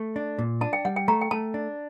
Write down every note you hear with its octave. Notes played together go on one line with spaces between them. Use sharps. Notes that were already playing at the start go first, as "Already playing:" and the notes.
Already playing: A3
D4
A#2
D4 A5
G5
G3 F#5
G5
A3 A#5
G5
A3 A5
D4